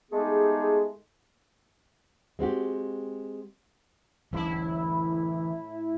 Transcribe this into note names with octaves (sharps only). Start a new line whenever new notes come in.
G#3 A3 B3 D#4 G4 G#4
G#3 C4 F#4 G4
A2 E3 F#3 C#4 E4